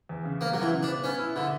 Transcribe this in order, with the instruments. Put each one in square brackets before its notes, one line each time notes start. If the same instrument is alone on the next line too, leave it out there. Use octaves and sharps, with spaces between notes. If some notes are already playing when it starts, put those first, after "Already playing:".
[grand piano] E2
C#3
[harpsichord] A#3 [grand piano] B3
[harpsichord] F#3
[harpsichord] E3 [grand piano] B3
[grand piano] C#3
[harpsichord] D4
[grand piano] B3
[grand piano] B3 [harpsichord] C#4
[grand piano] E4
[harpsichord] D3 [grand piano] E4